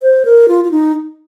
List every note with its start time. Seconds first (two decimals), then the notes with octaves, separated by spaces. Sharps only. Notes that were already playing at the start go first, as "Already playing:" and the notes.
0.02 C5
0.25 A#4
0.48 F4
0.64 F4
0.71 D#4